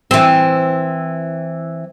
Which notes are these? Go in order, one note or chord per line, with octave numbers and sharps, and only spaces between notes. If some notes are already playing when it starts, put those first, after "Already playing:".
E3 C4